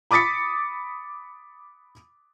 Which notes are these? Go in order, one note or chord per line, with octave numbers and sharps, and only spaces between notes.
B5 D6 D#6 A6 B6 C#7